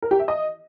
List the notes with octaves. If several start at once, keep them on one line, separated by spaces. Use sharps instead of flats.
A#4
G4
E5
D#5